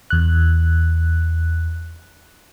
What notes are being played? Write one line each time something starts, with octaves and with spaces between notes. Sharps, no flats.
E2 F#6